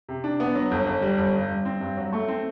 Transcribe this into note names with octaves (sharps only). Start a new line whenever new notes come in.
C3
D4
B3
F#3
G1
G1
G3
G1
G2
G2
C4
G2
F#3
A3
C4